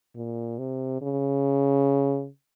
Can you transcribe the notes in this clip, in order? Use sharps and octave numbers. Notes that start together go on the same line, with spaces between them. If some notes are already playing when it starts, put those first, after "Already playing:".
A#2
C3
C#3